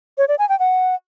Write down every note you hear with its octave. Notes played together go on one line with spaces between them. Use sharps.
C#5
D5
G#5
G5
F#5